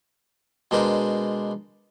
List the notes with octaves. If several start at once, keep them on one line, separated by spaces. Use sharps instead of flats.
B2 G#3 D4 A#4 C5